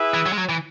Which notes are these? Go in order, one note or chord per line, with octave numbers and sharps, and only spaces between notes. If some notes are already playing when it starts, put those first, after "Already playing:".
Already playing: E4 G#4 B4 E5
E3
F#3
G#3
F#3
E3